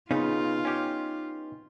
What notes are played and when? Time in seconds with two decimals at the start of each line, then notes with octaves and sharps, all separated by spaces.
0.11 C#3 B3 D#4 F4
0.65 C#4 G4